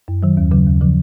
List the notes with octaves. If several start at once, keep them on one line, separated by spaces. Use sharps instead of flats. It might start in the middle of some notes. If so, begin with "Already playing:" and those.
F#2
D#3 F#3
D#2
C#3 F#3
D#2
C#3 F3